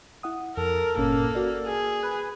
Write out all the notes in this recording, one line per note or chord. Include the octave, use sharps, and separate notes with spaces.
E4 F#5 D#6
F2 A4 A#4
G1 A#2 A#3 C#4
F#4 D5
G#4
B4 F#6